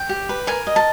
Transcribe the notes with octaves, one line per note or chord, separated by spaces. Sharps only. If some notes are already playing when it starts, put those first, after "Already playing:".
Already playing: G5
G4
B4
A#4 G#5
D#5
A5